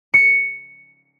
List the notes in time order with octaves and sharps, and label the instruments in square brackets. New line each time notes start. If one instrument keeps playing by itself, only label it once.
[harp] C#7